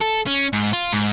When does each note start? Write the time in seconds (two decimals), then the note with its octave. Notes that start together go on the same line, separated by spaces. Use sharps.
0.01 A4
0.27 C#4
0.53 G#2
0.73 F4
0.93 G#2